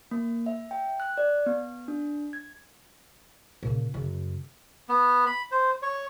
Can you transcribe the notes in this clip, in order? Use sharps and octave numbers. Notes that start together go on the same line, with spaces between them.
A#3
E5
G5
F#6
D5
B3
D4
G#6
A#2 C#3
F#2 C#3
B3
B5
C5
C#5